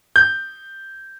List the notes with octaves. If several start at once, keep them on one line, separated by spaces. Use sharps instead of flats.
G6